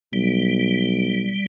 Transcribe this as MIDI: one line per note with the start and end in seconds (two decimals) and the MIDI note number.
0.13 1.38 35
0.13 1.46 55